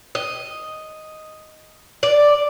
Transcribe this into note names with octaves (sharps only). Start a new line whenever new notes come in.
D#5
D5